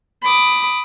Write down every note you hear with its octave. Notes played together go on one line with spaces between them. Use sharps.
B5 D6 D#6